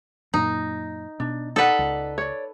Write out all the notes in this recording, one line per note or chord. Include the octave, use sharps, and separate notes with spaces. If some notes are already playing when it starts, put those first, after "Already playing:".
F#2 A#2 D#4
B2 D4
D#4 A4 B4 D5 F#5
C#2
C#5 D5